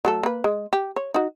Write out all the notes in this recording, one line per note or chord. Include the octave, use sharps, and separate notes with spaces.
F#3 A3 A4
A#3 B4
G#3
G4
C#5
D#4 F#4